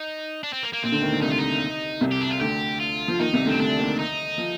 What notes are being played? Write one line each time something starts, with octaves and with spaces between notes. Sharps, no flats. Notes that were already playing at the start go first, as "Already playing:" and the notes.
Already playing: D#4
D4
C4
A#3
A#3
A#1 A#2 C4
D2 D3
D#2 D#3
D2 D3
C2 C3 D#4
F4
D#4
C2 C3
G4
D4
F4
D2 D3 G4
F4
F3
D#2 D#3 D#4
C2 C3
D2 D3
C4
D2 D3 D4
D#2 D#3
D#4
F3